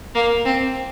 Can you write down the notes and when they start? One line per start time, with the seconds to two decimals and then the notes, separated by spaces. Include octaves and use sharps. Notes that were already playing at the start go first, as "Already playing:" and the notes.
0.15 A#3
0.45 C4